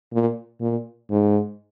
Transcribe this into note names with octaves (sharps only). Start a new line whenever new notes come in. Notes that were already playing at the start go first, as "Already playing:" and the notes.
A#2
A#2
G#2